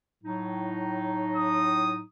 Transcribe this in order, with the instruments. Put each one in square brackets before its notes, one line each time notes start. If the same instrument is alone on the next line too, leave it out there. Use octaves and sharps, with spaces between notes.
[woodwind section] A2 F#3 D#4
[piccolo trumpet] D#6